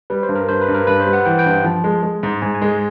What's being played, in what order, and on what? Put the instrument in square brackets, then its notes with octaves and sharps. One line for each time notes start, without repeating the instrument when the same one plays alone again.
[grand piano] G3 [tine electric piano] B4
[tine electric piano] C5
[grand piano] G2
[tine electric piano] A#4
[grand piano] G2 [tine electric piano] C5
[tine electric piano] B4
[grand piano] G2
[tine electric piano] A#4
[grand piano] G2 [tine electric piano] B4
[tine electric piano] C5
[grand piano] G3
[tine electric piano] F#5
[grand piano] E3 [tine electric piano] G5
[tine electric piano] G5
[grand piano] G2
F3
G#3
G#3
G#2
[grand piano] G#2 [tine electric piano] G#5
[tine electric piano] G#5
[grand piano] G#3
[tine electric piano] G#5